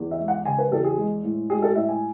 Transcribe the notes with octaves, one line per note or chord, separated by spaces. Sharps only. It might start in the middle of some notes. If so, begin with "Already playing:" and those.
Already playing: E2
E5
G#3
F#5
C#3 G#5
B4
E2 A4
G#4
G#3
A2
G#3 G#4
A4
A2 E5
G#5